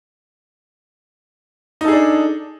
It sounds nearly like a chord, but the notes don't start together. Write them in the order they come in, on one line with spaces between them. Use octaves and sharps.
D#4 A4 G#4 D4